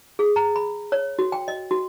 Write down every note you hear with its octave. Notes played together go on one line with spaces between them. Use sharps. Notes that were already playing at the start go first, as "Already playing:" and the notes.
G#4
A#5
B5
C#5
F#4
G5
D#5
F#4